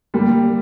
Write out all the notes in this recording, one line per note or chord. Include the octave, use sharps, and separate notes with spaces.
G3 A#3